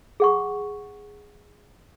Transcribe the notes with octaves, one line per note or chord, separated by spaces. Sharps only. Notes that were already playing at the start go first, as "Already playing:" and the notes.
G#4 F#5 C#6